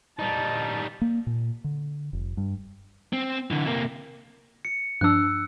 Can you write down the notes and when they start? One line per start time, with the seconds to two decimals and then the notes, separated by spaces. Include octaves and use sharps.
0.19 G3 D#4 A5
1.01 A#3
1.27 A#2
1.64 D3
2.13 F1
2.37 G2
3.13 C4
3.51 D3 E3
3.66 C3 A#3
4.65 C#7
5.01 G2 F3 D4 E6 F#6